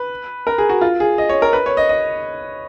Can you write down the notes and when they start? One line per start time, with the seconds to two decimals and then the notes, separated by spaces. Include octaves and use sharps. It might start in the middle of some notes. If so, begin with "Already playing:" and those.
Already playing: B4
0.47 A#4
0.58 G#4
0.69 F#4
0.81 F4
1.00 G#4
1.18 D#5
1.29 C#5
1.42 A#4
1.53 B4
1.66 C#5
1.77 D#5
1.89 D#5